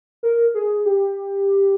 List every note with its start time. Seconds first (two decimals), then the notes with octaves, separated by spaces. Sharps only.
0.23 A#4
0.55 G#4
0.85 G4